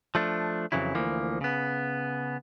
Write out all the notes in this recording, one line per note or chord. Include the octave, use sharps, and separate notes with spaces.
F3 A3 D4
F2 A2 C#3 E3 F#3 E4
D2 E3 F3 A#3
C#3 B3